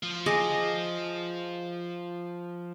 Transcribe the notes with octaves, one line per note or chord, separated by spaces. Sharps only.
F3
G#4 D#5 D6